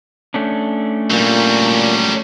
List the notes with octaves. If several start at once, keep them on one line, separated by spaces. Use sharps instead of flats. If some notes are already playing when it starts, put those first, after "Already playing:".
A3 C#4 D4
A#2 F#3 G3